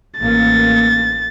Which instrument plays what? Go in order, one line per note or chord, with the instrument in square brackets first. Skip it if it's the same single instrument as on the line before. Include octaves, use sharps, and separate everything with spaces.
[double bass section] A1 A#3 [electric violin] A6